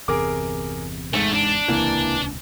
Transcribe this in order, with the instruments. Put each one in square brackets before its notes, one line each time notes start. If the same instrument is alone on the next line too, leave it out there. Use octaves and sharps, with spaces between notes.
[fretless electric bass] G1 E2 C3 [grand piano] G#4 A#4 D6
[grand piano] G#2 [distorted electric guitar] A3
[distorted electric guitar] D4
[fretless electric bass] D#1 C#2 C3 [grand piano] E3 A#3